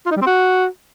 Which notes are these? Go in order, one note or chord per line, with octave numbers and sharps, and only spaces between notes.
F4
D#4
G3
C4
F#4